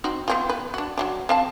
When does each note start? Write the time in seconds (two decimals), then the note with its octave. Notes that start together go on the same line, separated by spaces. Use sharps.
0.04 C4 D#4 F#4
0.28 B3 C4 F4
0.49 B4
0.74 D4 F#4
0.98 F#3 G3 D4
1.29 C4 F5 A5